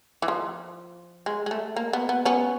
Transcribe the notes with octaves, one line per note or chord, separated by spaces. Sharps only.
E3
F3
G#3
G#3
A3
A#3
B3
B3
B3 C#4